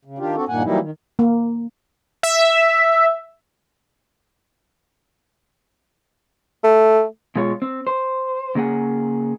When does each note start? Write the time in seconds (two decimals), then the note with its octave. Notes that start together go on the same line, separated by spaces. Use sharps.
0.05 C#3
0.19 D#3 D4 F4 G4
0.36 C4 D4 F#4 A4
0.48 G2 A#2 D#3 A#3 F#5 G#5
0.64 E3 F#3 G3 A#3 D#4 E4
0.79 D#3
1.19 A#3
2.23 E5
6.64 A3
7.36 B2 G#3 F4 C#5
7.62 C4
7.87 C5
8.55 C#3 A#3 G#4 F#5